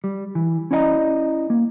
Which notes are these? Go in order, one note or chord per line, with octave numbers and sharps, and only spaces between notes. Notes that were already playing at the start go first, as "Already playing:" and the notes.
G3
E3
C#4 E4 D5 D#5 F#5 A#5
A#3